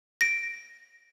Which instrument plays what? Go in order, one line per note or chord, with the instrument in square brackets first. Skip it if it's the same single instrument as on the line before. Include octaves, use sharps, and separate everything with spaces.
[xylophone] A#6 D7